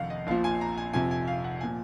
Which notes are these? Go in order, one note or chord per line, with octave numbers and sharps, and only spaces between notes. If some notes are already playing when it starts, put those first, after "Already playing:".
Already playing: F1 F2 D#3 F5 F#5
D#5
A#1 A#2 F3 F5
G#5
A#5
G#5
F1 F2 C3 F3 G#5
G#5
F5
F#5
A#2 F3 G#5